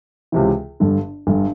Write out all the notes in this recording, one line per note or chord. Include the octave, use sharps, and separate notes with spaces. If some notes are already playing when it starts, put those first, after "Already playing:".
C#2 C3 E3
G1 G2 D3
G1 G2 D3